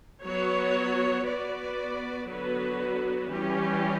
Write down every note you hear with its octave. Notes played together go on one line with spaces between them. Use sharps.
F#3 B3 F#4 C#5
B3 F#4 B4 D5
D3 F#3 B3 F#4 B4
E3 G3 C#4 G4